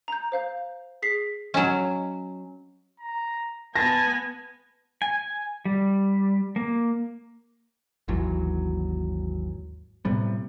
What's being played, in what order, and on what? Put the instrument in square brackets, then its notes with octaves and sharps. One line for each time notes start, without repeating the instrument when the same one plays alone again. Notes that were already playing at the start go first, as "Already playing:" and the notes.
[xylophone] A#5 G6
C5 F5 G6
G#4 B6 C7
[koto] F#3 C#4 [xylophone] D#5
[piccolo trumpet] A#5
[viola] B3 G#5 [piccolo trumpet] A5 [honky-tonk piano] A#6
[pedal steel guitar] G#5
G3
A#3
[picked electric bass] G#1 D#2 E3 F#3
A2 C3 G3 B3